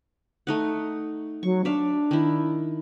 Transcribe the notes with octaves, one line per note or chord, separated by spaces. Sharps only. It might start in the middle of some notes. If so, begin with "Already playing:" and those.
A3 D#4 F#5
F#3 C#6
D4 D5 E5 F5
D#3 E4